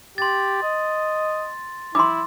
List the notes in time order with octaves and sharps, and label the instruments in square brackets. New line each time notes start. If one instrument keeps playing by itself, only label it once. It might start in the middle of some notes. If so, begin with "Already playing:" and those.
[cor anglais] G4 [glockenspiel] C6 A6
[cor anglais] D#5
[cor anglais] E4 [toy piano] C6 D6